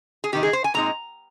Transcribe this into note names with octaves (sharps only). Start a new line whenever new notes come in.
G#4
C3 D#3 A#3 D#4 G4
G#4
C5
G#5
A#2 G#3 C4 D#4 A#5